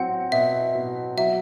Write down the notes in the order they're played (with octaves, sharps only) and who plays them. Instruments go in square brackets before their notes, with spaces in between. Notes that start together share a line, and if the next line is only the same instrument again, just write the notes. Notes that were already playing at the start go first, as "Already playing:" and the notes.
Already playing: [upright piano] F#3 C4 [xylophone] F#5
[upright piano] B2 [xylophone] E5
[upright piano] B2
[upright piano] F#3 [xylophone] E5